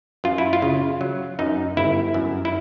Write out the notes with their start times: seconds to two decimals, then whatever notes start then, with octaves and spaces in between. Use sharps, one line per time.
0.24 F#2 F4
0.38 E4
0.53 F4
0.62 C#3
1.01 F#3
1.39 F#2 D#4
1.77 G1 E4
2.14 F#2
2.45 E4